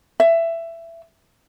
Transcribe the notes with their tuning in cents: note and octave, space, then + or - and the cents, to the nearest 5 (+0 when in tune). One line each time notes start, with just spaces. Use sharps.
E5 +15